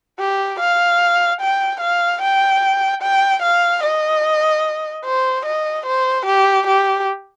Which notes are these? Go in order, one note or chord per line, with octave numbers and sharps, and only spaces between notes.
G4
F5
G5
F5
G5
G5
F5
D#5
C5
D#5
C5
G4
G4